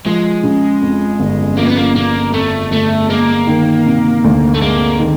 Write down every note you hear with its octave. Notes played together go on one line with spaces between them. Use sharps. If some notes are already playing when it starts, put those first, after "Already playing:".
F3 G#3
C#3
F2
G1
F3 A#3
B3
A#3
C#3 A#3
F2 A3
G1 A3
G#3 A#3
D#3
C3
D2
A3
G#3 A#3
D#3